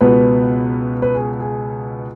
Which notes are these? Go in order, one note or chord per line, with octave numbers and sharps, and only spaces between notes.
C#2 B2 B3 B4
B4
G#4
G#4